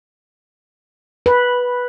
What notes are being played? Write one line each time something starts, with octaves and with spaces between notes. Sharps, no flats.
B4